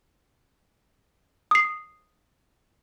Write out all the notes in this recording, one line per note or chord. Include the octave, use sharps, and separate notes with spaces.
D#6 C7